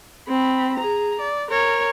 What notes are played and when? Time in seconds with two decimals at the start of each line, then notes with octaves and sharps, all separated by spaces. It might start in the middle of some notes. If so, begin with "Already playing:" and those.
0.28 C4 B5
0.77 G#4 A#5
1.20 D5
1.50 A#4 C#5